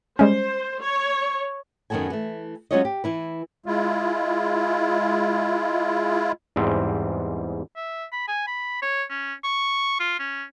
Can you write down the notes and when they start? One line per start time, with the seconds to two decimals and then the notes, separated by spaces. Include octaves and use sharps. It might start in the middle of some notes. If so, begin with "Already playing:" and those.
0.19 G3 G#3 C#4 C5
0.81 C#5
1.90 F#2 D#3 F#3 B3 A4 G#5
2.10 E3 A3
2.71 F#3 G#3 C#4 F4 C#5 D#5
2.85 G4
3.04 E3 E4 B4
3.66 G#3 E4 F4
6.56 E2 G#2 G3 C4
7.76 E5
8.12 B5
8.28 G#5
8.47 B5
8.82 C#5
9.10 C#4
9.44 C#6
10.00 F4
10.20 C#4